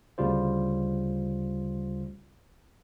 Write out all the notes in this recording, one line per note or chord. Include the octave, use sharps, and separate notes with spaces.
D2 C#3 G3 F4 C5